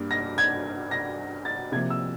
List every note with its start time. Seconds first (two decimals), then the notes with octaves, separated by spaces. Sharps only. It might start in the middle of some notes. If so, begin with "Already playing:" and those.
Already playing: G2 G3 A#3
0.11 A#6
0.38 G#6
0.91 A#6
1.45 A6
1.72 C3 F3 A#3 G#6
1.90 E6